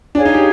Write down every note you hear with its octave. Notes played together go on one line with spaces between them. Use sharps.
D4 G#4 C#5 F5 G#5
D#4
G4